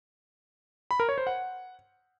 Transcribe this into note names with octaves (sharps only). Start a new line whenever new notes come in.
B5
A#4
C#5
C5
F#5